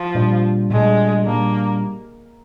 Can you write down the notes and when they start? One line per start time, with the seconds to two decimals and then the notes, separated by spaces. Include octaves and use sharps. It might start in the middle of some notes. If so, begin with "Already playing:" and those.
Already playing: F3
0.15 A#2 G3 D4
0.70 A#2 G3 G#3 D4
1.26 A#2 G3 A#3 D4